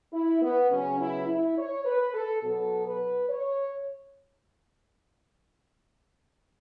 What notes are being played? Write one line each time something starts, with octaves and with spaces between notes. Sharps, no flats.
E4
B3
C#3 F#3 B3 C#4
E4
E4
C#5
B4
A4
B2 F#3 B3 A4
B4
C#5